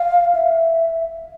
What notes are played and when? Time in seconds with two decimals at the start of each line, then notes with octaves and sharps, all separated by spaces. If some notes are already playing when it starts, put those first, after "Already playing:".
Already playing: F5
0.35 E5